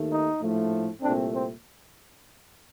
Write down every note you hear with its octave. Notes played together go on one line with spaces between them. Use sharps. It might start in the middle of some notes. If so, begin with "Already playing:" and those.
Already playing: D#2 D#3 A3
D#4
A#1 A2 F3 A3
C2 A#2 A3 C4 D4
C4